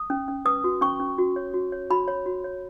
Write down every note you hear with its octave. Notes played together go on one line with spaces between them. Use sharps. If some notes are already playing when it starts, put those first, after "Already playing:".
Already playing: D#6
C#4
C#4
B4 D#6
F#4
C#4 C#6
C#4
F#4
C#5
F#4
C#5
F#4 B5
C#5
F#4
C#5